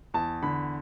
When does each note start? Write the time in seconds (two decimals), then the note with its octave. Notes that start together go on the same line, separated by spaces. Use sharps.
0.14 E2 A5
0.43 D3 B5